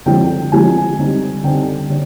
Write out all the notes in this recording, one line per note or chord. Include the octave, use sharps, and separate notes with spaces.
D3 F3 G#3 C4 G5
D3 F3 G#3 C4 G#5
D3 G3 C4 D#4
D3 G3 C4 D#4 G5
D3 D4